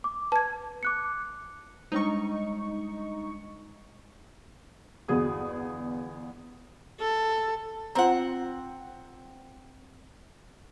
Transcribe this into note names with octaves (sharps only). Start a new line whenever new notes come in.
D6
B4 A5 G#6
D6 F#6 C#7
G3 G#3 D4 D#4 C#6
G1 E2 F#4 G#4 D#6
A4
C4 F4 C5 F#5 A#5